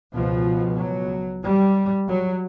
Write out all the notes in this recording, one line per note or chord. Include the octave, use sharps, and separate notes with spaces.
C#2 B2 F3
F#3
G3
F#3